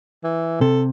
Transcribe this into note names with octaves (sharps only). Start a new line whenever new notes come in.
E3
C3 A4